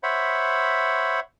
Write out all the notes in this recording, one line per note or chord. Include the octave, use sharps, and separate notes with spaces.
C5 C#5 E5 F#5 B5